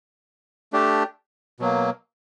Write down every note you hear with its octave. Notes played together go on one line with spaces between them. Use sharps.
A3 D4 G4
B2 F#3 A#3